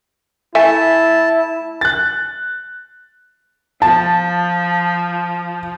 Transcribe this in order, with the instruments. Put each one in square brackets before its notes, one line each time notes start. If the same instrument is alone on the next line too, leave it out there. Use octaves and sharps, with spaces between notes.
[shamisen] A3 E5 G#5 [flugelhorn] E4 [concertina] A5
[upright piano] F#6 A6
[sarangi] F3 [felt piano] A5